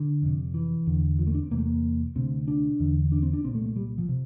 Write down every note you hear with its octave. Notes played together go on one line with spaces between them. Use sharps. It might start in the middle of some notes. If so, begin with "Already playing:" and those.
Already playing: D3
F2 C3
E3
E2 D3
F3
A3
D4
C4
E2 C3 A#3
A3
A#3
D2 C3 C4
D4
E2 D3
D4
C4
D4
C2 A#2 C4
A3
A3
G3
F3
C3